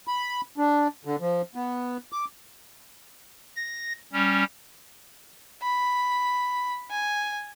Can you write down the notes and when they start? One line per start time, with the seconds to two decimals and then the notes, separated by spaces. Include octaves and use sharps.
0.07 B5
0.58 D4
1.05 D3
1.20 F3
1.55 B3
2.12 D6
3.56 A#6
4.13 G3 C#4
5.63 B5
6.91 G#5